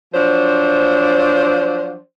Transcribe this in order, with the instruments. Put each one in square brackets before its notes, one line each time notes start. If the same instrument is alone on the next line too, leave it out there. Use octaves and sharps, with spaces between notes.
[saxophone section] F3 F#3 D4 C5